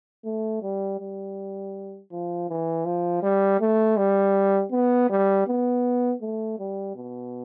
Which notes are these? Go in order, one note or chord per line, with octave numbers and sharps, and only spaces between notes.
A3
G3
G3
F3
E3
F3
G3
A3
G3
B3
G3
B3
A3
G3
B2